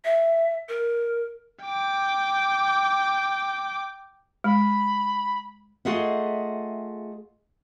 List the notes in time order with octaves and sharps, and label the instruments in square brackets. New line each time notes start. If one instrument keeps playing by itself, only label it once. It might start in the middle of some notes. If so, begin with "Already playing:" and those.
[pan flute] E5
A#4
[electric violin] G5 D6
[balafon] G#3 [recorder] B5
[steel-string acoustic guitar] A3 F4 G#4 D#5 E5 F#5